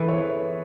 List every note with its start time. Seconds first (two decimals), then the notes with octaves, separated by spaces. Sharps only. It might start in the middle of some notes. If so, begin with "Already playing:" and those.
Already playing: E3 G#4 A4 B4
0.08 C#5